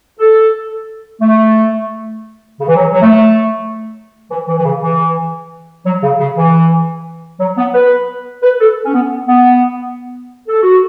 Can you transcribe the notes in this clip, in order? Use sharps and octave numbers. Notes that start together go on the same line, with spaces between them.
A4
A3
C#3
E3
F#3
F#3
A3
E3
E3
E3
C#3
E3
F#3
C#3
C#3
E3
F#3
B3
B4
B4
A4
C#4
B3
B3
A4
F#4